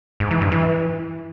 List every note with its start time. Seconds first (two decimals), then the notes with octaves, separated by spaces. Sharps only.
0.20 G#2
0.31 E3
0.41 G2
0.52 E3